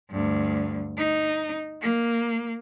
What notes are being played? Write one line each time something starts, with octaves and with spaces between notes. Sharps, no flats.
D2 G2
D#4
A#3